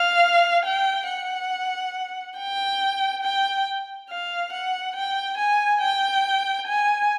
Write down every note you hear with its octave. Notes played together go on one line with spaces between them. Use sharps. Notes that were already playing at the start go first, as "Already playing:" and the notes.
Already playing: F5
G5
F#5
G5
G5
F5
F#5
G5
G#5
G5
G#5